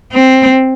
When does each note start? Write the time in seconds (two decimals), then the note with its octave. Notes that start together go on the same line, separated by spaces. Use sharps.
0.12 C4